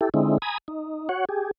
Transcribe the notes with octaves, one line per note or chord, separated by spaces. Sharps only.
E4 G4 A4
D3 G#3 C4 D#4 E4
G#5 A#5 B5 D#6
D#4
F#4 C#5 F#5
G4 G#4